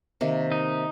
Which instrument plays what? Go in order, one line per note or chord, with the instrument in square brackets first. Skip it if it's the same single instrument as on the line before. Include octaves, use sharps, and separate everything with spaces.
[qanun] C3 D#3 A#3
[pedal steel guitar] D#4